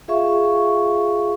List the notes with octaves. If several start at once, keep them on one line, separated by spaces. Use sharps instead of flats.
F4 G#4 E5 F5 C#6